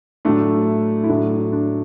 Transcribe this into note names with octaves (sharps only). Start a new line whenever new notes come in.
A2 F#3 A3 D4
E4
A2 F#3 A3 D4
D4